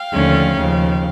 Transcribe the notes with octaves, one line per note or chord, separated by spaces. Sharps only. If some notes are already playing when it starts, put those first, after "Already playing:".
Already playing: F5 G5
D#2 D3 F3 A3 C#4
D#2 C#3 F3